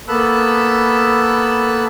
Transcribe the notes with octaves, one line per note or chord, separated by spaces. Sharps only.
A#3 B3 A4 B5 E6 F#6